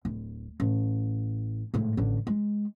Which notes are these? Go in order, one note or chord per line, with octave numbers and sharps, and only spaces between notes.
D1
A1
G#1 A2
A1 D3
G#3